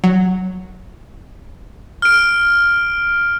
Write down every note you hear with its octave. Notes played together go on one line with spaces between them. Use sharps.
F#3
F6 D7